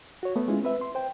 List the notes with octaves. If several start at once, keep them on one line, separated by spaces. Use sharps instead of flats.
F#4 C#5
A3 B3
G#3 C#4 E4 F4
C4 B4 E5
C6
C5 G5